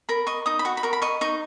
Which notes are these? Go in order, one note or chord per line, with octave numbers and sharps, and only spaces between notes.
A#4 B5
D#5 C#6
D#4 D#6
B5
F#4 C#6
B5
A#4 C#6
B5
D#5 C#6
D#4 C#6